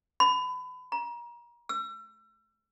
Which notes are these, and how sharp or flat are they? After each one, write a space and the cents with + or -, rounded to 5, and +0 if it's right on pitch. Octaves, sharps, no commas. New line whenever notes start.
B5 +30
A#5 +35
E6 +35